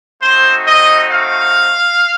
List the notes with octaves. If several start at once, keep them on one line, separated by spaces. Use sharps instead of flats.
A3 C4 D#4 F#4 C5
D#5
F5